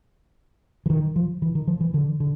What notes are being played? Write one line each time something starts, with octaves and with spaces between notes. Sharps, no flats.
E3
D#3
F3
E3
D#3
F3
E3
D3
D3